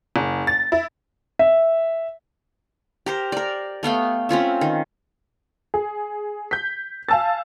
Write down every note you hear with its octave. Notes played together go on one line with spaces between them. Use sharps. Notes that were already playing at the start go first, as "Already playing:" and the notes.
F#1
A6
E4
E5
G4 A#4 C5
A#4 D5
A3 B3 F5 G5
C4 C#4 F4 E5
D#3
G#4
G6 B6
F5 G#5 A5 E6 A6